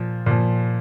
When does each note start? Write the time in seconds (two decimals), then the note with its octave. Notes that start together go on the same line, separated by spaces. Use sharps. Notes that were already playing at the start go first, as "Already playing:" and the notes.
Already playing: A#2 F3
0.26 A#2 F3